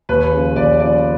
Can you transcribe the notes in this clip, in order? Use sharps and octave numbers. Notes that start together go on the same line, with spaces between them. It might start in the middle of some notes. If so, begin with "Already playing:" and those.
D#2 B4
C#3 F3
D#2 D5
C#3 F3 D5